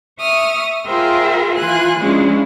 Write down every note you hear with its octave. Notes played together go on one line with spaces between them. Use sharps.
E5 C#6 D#6 F6
F4 G#4 A#4 C5 E5 G5
E3 F4 G#5 F#6
F3 G#3 C#4 D4 E4 F4